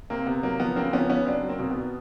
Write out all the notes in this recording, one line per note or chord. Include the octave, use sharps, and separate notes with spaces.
C3 A#3 C4
C3 B3
F#3 A#3
F3 B3
C#3 A#3 C4
F3 B3 C#4
C#3 B3 C#4
F#3 C4 D4
F#3
A#3 C4
B2
B3
B2